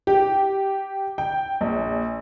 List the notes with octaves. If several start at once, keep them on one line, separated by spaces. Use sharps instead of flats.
G4
G5
A#1